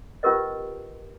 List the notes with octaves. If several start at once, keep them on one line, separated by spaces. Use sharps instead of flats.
C#4 F4 G4 A#4 B4 D#5